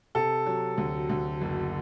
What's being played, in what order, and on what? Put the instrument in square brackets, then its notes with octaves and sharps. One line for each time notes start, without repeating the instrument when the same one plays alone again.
[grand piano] C3 [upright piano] A4
[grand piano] F#3
D2
D2
F#1